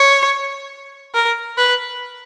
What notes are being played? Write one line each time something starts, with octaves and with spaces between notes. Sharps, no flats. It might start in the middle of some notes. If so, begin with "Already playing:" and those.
Already playing: C#5
A#4
B4